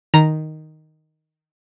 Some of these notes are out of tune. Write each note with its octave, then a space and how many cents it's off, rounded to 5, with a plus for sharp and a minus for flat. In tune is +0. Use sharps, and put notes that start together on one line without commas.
D#3 +0 A#5 +0